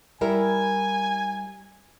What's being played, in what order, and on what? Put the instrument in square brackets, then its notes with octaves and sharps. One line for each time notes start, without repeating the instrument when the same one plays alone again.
[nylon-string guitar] G3 E4 A#4 [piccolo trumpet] G#5